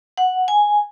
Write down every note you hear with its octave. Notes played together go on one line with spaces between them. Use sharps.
F#5
G#5